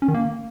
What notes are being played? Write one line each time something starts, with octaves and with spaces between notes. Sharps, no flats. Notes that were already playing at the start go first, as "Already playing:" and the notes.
C#4
D#3
A#3